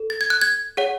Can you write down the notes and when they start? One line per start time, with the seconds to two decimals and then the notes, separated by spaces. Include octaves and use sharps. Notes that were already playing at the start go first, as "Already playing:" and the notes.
Already playing: A4
0.10 A6
0.21 G#6
0.30 F#6
0.41 G#6
0.77 G#4 C#5 F#5